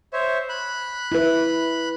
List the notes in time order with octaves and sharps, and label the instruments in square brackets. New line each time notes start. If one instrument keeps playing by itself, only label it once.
[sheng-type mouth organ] C5 C#5 E5
B5 F#6
[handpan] E4 B4